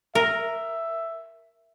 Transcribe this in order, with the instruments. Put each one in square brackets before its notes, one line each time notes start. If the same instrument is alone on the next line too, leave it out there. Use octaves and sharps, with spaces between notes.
[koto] A#4 [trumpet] E5